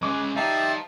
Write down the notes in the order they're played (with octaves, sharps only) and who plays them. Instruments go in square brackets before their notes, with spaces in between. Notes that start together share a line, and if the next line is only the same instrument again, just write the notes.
[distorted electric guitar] G#3 C#4 [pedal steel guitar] D6 F#6
[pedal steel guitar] D#4 [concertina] G4 D5 E5 [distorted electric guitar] F5 A5